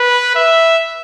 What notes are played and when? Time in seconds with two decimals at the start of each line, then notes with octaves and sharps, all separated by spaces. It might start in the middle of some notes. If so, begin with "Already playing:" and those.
Already playing: B4
0.36 E5